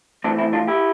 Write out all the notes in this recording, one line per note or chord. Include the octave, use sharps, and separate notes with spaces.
E3 A3 C4 D4
C4 E4
D4 F4
E4 G4